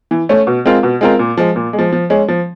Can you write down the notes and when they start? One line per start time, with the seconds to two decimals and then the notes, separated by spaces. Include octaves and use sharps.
0.11 E3
0.29 A3 C#4
0.47 B2
0.65 G#3 C4 F4 A#4
0.83 B2
1.01 G#3 C4 F4 A#4
1.19 A#2
1.37 F3 G#3
1.56 A#2
1.73 G#3
1.79 F3
1.92 F3
2.10 G#3 C#4
2.28 F3